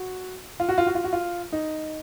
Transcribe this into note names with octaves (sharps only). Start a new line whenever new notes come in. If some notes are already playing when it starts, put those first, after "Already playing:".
Already playing: F#4
F4
F#4
F4
F#4
F4
F#4
F4
D#4